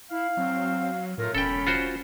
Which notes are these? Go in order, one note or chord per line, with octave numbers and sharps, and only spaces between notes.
E4 F5
F#3 C4
A2 F#3 A3 F4 A#4
E1 C#4 A4 G5 B5
F4 F#4 C5